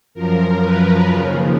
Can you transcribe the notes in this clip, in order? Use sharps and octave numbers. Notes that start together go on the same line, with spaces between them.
F#2 F3 A#4
B4
D#2 C#3 F3